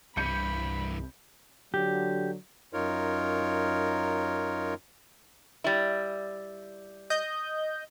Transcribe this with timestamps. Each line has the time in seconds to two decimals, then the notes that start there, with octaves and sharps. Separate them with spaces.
0.17 C2 G2 E3 B5 G6 C#7 D#7
1.74 D3 F#3 G4
2.73 F#2 D#4 F4 A#4 C#5
5.64 G3 E4
7.10 D#5 G6